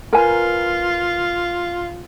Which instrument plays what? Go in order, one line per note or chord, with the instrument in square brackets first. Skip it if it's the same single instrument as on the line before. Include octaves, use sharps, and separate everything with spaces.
[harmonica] F4 [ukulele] A#4 B4 G#5